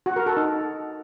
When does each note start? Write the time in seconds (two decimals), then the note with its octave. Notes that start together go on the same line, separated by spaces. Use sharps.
0.06 F#4
0.16 A#4
0.26 A4
0.37 D#4